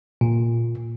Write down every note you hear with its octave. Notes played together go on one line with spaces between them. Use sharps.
A#2